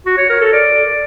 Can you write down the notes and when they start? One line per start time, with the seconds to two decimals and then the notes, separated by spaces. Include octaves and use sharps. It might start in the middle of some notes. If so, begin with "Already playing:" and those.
0.06 F#4
0.18 C#5
0.29 A#4
0.41 A4
0.53 D5